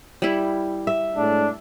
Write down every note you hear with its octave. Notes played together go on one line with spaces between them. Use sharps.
G3 E4
E5
A2 G#3 D4